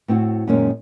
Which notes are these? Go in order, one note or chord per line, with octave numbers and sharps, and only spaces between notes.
A2 C4 E4 F#4
F#2 A#2 D#3 G#3 A#3 C#4